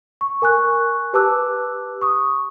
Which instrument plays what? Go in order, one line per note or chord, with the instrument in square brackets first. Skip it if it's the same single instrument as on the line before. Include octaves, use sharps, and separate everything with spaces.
[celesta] C#6
A#4 G#5 C#6 F#6
G4 B4 A5 D6 E6 F#6
C#6 D#6